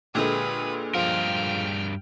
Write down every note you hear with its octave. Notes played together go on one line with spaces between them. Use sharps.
A#2 D3 G#3 G4 B4 E5 A#5 D#6
G2 F3 A#4 G5 F6